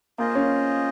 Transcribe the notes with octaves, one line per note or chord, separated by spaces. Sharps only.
A#3 F4 G#4 C5 D#5
C#4